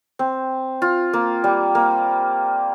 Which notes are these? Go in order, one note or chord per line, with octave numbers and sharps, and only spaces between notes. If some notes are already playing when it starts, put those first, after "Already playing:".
C4
F4
A#3
G3
A#3